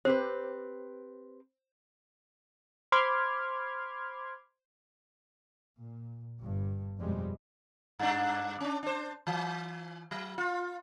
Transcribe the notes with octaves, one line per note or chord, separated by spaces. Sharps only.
C4 G4 B4 C5
C5 B5 C6 D6 F6 G#6
A#2
G1 G2
F2 B2 G3 G#3
G2 D4
C#4 D4
D4 C5
E3
F#3
F4